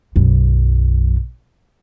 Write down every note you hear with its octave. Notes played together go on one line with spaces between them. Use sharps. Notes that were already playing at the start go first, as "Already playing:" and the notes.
B1 F#2